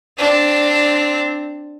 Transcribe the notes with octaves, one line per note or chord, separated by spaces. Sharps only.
C4 D4